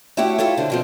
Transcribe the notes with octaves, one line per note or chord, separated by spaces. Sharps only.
A3 E4 F#4 G4 C#5 F#5
E4 F4 A4 C#5
D3 C5
B2 F3 C4